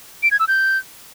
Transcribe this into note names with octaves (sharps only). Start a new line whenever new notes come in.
D7
G#6
E6
G6